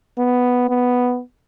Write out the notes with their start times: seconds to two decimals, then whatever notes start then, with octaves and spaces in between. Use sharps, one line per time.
0.18 B3
0.69 B3